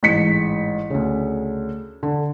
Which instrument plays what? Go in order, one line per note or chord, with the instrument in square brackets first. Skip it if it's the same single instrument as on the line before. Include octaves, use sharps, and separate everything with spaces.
[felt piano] A1 G#2 B6 C#7
D2 C#3
D3